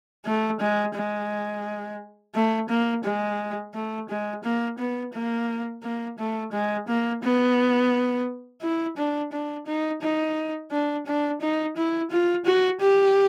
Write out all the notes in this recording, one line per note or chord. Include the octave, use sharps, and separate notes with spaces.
A3
G#3
G#3
A3
A#3
G#3
A3
G#3
A#3
B3
A#3
A#3
A3
G#3
A#3
B3
E4
D4
D4
D#4
D#4
D4
D4
D#4
E4
F4
F#4
G4